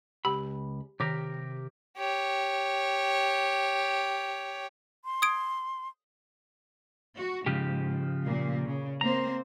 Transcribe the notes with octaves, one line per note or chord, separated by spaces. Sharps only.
C#2 G4 B5
C3 D#3 G4 A#4
G4 C#5
C6
D#6 G#6 D7
F#4
G#2 C#3 F3 G4
A#2 A#3
C#3
A#3 C4 C5 A#5